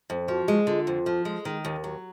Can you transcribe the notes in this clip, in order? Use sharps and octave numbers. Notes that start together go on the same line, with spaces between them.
F2
F3 F#4
G#3
D3 F4
F2
F3
G#3
D#3
D#2
F#3